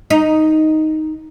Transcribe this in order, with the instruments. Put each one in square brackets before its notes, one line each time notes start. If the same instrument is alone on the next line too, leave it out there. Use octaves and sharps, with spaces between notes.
[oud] D#4